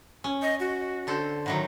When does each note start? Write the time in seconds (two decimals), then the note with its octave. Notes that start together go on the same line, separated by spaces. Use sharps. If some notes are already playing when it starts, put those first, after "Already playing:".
0.24 C#4
0.42 D#5
0.60 F#4
1.07 D3 A4 C5
1.46 A2 D#3 F#3 F#5